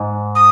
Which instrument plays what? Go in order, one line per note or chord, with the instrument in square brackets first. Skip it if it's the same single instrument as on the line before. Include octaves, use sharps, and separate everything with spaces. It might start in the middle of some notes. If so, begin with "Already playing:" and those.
Already playing: [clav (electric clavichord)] G#2
[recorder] D#6